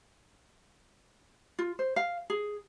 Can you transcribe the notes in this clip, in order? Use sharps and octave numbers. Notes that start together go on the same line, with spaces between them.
F4
C5
F5
G#4